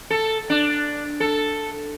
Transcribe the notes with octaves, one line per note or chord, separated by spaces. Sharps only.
A4
D4
A4